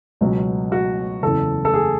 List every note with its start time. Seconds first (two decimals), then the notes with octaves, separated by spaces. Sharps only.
0.21 C#2 B2 F#3
0.72 F#4
1.23 F#1 E2 C#3 A4
1.65 A4
1.74 G#4